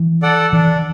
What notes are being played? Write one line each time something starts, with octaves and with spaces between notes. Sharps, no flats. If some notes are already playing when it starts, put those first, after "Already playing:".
Already playing: E3
A4 D5 F#5
E3 D4